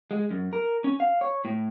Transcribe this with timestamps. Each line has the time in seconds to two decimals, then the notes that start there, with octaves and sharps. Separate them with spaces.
0.11 G#3
0.31 F#2
0.53 A#4
0.84 C#4
1.00 F5
1.21 C#5
1.45 A2